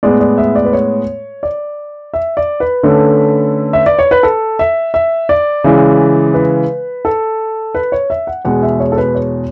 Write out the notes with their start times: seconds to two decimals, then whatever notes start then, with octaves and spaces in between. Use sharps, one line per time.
0.03 A2 G#3 B3 D5
0.20 D5
0.38 E5
0.55 D5
0.65 B4
0.73 C#5
1.43 D5
2.14 E5
2.37 D5
2.60 B4
2.83 D3 A3 C#4
3.73 E5
3.86 D5
3.99 C#5
4.11 B4
4.23 A4
4.59 E5
4.94 E5
5.29 D5
5.64 C#3 E3 G#3
6.34 B4
7.05 A4
7.75 B4
7.92 C#5
8.10 E5
8.27 F#5
8.45 E2 B2 G#3 F#5
8.63 E5
8.80 C#5
8.92 A4
8.98 B4
9.15 C#5